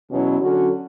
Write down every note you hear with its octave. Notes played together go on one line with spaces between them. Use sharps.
E2 B2 F#3 C#4 E4
D3 F#3 C#4 F#4 A4